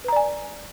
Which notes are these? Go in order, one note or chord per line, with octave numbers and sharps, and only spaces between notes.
B4 D5 G#5 A#5